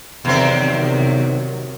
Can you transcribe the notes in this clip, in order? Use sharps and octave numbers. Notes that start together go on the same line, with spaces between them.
E2 C3 D#3 F#3 C4